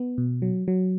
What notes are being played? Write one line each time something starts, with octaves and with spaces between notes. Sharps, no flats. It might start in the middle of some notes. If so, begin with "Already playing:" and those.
Already playing: B3
B2
F#3
F#3